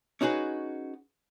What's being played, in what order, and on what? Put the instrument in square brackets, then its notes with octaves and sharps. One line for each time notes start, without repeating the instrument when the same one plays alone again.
[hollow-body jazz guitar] C#4 D#4 F#4 G#4 B4